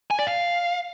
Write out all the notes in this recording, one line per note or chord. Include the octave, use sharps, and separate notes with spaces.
G#5
D5
F5